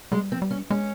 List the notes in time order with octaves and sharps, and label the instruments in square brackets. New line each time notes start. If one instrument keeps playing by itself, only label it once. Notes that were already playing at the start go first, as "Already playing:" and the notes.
[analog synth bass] G3 [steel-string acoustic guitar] G#3
[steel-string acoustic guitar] C4
[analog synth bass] F3
G3
[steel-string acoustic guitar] C#4
[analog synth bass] G#3 [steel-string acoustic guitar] C#4